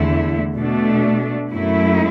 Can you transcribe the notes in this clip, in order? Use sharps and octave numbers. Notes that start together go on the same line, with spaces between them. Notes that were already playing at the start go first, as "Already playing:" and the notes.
Already playing: E2 D3 A3 E4
B2 A3 D4
F#2 F#3 A3 E4